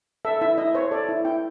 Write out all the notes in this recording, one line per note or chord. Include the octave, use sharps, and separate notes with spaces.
A4 E5
E4 E5
E4 D#5
C5 C#5
A4 D5
E4
E4 G5